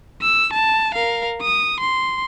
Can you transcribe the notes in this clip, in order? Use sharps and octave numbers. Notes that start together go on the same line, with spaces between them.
E6
A5
A#4 F5
D#6
C6